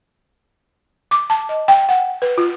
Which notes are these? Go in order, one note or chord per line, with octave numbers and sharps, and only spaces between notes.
D6
A5
D#5
G5
F#5
B4
F4